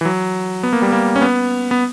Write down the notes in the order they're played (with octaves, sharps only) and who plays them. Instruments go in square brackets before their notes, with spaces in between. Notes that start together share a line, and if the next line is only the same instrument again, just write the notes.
[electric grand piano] E3
F#3
B3
A#3
G3
A#3
C#4
B3
B3